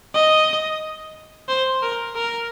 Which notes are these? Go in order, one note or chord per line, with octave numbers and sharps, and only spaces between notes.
D#5
C5
A#4
A#4